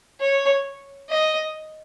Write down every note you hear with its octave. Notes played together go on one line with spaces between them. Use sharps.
C#5
D#5